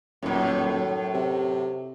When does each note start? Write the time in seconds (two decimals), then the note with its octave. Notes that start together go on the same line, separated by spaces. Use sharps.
0.23 D#1 F#2 A2
1.14 C3